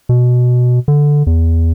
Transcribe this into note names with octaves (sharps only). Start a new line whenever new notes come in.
B2
D3
E2